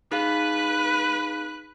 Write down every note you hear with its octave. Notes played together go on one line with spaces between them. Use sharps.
D#4 G#4 B4 F5 F#6